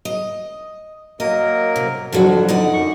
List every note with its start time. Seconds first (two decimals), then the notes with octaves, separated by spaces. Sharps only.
0.05 D#5
1.20 F#3 A#3 A#4 D#5
1.76 C3
2.13 F2 D3 F3 F#3 F#4
2.49 D#4 D5 F#5
2.73 F#2 C#6